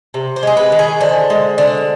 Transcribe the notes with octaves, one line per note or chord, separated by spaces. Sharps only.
C3
C5
G#3 G#4
B4
D#3
G#4
D3 C5
G#3
D3